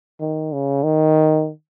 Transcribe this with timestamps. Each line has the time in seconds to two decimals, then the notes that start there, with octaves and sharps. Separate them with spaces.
0.20 D#3
0.53 C#3
0.84 D#3